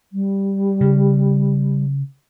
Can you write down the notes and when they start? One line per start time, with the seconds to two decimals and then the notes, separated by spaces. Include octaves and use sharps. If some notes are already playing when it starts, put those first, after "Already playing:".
0.12 G3
0.81 C#3